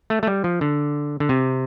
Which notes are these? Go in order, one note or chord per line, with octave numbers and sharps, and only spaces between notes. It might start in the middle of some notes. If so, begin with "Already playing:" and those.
A3
A3
G3
F3
D3
D3
C3